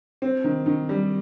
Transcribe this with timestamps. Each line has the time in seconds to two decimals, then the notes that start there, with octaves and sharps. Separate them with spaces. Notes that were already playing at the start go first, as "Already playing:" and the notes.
0.22 C4
0.44 D#3
0.66 D#3
0.89 G3